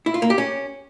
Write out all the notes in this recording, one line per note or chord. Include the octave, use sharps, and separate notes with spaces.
E4
F4
A#3
G4
C#4